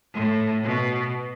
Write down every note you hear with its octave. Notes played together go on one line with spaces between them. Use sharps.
A2
B2